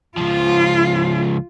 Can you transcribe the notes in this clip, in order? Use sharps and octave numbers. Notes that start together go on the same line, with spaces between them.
C#2 F3 F4